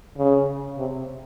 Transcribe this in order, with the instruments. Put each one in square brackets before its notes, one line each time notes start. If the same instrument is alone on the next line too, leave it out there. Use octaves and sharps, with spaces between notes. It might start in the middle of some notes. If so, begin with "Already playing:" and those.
[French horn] C#3
C3